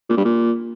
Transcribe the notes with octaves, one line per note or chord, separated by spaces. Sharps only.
A#2
G2
A#2